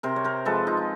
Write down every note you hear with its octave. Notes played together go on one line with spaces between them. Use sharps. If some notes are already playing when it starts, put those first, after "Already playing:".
C3 A#4 C5
C#5
A#4 C5
F3 G#3 A4 B4
D#4 F4
D#4